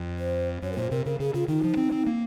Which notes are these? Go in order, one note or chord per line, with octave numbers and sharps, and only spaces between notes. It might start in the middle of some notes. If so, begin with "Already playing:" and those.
Already playing: F2
C5
F#2 C#5
A#4
A#2 C5
C3 A#4
C#3 A#4
C#3 G#4
C#3 F4
D#3 D#4
F3
C4
C4
A#3